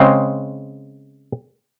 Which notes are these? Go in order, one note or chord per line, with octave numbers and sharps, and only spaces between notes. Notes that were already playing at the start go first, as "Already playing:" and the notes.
Already playing: C#3 G#3 C4